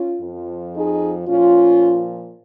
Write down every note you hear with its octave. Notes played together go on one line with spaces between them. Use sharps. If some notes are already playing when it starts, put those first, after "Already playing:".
Already playing: C#4 F4
F2 F3
D#4 G#4
A#2 F3 C#4 F4